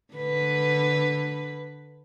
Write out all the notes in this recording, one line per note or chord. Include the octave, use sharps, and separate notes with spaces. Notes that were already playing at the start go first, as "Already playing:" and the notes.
D3 B4